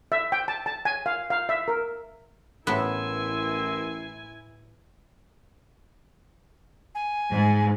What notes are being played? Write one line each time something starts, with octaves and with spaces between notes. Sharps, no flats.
E5
G5
A5
A5
G#5
F5
F5
E5
A#4
A1 A2 B3 E4 A#4 G#5 C6 E6
G#5
G#2